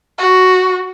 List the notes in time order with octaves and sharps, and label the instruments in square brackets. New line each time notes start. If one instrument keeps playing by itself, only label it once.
[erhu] F#4